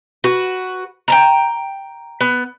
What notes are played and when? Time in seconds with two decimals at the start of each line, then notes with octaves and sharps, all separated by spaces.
0.24 F#4 B4
1.08 G5 A5 A#5
2.21 B3